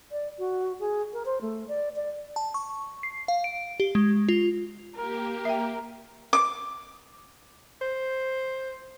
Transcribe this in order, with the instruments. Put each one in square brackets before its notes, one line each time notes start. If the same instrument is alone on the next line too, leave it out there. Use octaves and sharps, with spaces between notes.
[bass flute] D5
F#4
G#4
A#4
C5
A3
D5
D5
[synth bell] A5
C#6
C7
F5
D7
G4
G#3
F4
[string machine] A#3 G4 [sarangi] A#4
[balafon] E5 G5
[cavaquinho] D6
[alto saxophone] C5